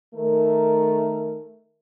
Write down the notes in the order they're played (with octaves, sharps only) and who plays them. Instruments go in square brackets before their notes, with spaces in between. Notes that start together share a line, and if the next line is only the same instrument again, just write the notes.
[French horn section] D#3 A3 A#4